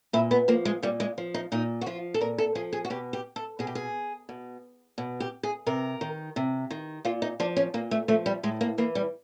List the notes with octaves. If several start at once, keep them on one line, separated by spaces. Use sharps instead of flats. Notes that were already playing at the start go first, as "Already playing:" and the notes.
A#2 E4
B3
F3 A#3
G#3
A#2 G3
G#3
F3
D#4
A#2 D#4
F#4
F3 F4
A4
A#2 A#4
A4
F3 G#4
G#4
F#4
B2 G4
G4
A4
B2 G#4
G4
G#4
B2
B2
G4
G#4
C3 A#4
D#3
C3
D#3
A#2 F4
D#4
F3 D4
C#4
A#2 A#3
A3
F3 A3
G3
A2 G#3
A#3
E3 A#3
G3